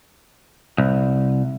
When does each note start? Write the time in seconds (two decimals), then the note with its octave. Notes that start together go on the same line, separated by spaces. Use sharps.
0.78 C2